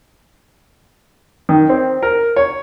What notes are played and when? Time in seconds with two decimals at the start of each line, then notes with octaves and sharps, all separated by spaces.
1.49 D#3
1.69 C4
2.03 A#4
2.36 C#5